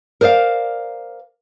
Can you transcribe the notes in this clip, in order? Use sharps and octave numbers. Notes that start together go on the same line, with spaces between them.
A#4 C5 D5 D#5 F5